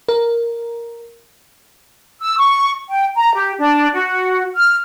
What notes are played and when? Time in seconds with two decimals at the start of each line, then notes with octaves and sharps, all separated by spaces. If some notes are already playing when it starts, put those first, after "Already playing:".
0.09 A#4
2.20 E6
2.37 C#6
2.89 G5
3.15 A#5
3.34 G4
3.58 D4
3.93 F#4
4.55 F6